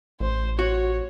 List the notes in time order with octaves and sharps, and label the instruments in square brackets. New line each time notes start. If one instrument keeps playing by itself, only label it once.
[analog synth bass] A1 [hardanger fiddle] C5
[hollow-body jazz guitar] F#4 [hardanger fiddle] C#5